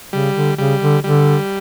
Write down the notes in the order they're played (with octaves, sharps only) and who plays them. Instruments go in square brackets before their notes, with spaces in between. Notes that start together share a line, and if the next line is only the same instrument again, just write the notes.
[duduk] C#3 [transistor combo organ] G3
[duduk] D3
[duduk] C#3 [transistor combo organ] G3
[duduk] D3
[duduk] D3 [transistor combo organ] G3